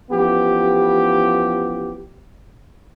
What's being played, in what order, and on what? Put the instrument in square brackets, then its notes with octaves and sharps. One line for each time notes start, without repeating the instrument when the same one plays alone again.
[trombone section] A1 F3 B3 G4